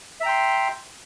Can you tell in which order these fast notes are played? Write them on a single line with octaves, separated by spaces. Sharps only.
E5 A#5 G5 C6